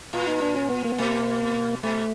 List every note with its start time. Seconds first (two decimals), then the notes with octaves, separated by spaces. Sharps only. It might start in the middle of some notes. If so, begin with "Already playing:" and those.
0.13 A#2 F4
0.27 D#4
0.42 D4
0.56 C#4
0.70 B3
0.84 A#3
0.92 B3
0.98 B2 A#3
1.83 B2 A3